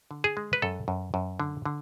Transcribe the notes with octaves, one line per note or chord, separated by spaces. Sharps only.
D3
G#4
G#3
B4
F#2 A4
F#2
F#2
D3
D3